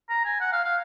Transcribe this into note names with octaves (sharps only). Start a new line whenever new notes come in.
A#5
G#5
F#5
F5
F5